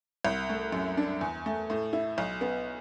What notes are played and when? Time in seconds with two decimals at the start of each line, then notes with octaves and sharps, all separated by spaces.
0.25 C2
0.49 A3
0.72 F#2
0.97 D4
1.21 E2
1.46 A3
1.70 A2
1.93 E4
2.18 B1
2.41 B3